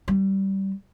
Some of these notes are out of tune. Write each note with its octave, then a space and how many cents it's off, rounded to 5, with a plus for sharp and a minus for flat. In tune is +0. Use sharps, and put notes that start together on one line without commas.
G3 -20